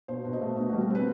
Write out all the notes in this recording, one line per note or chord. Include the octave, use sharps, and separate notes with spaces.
B2 C5
B2
D#5
A3
B2
G3 F#4
C4 B4